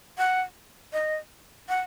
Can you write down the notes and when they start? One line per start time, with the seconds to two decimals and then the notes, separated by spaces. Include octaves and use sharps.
0.18 F#5
0.93 D#5
1.69 F#5